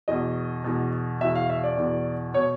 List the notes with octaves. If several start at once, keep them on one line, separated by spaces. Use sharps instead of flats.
E2 B2 D#5
E2 B2
E2 B2 E5
F5
E5
D5
E2 B2
B2 C#5